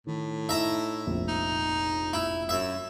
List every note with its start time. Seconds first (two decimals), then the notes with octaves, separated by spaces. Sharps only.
0.07 A2 D#3
0.49 D#4 E4 E5 A#5
1.07 F1 A#1
1.28 D#4
2.13 E4
2.49 F#2 E5